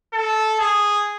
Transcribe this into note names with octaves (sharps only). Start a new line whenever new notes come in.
A4
G#4